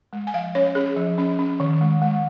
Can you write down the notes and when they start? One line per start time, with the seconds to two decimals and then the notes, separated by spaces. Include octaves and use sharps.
0.13 G#3
0.27 G#5
0.34 F3 F5
0.55 C#4 C#5
0.75 C#4 G#4
0.96 F3
1.18 C#4
1.39 C#4
1.60 D#3
1.81 G#3
2.02 G#3